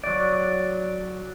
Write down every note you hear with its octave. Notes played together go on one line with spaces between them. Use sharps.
F#3 D5